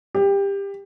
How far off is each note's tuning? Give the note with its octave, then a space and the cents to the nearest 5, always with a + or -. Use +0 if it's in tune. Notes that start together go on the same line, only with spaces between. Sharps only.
G4 +20